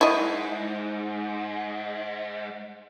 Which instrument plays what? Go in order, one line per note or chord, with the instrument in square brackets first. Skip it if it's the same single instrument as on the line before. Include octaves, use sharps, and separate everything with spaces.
[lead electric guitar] G#2 [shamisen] E4 D#5